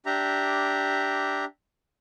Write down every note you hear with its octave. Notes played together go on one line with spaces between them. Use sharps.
D4 G4 E5 A#5